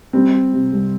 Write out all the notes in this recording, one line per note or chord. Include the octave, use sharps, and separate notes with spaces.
G3 C4
G3
C3
C2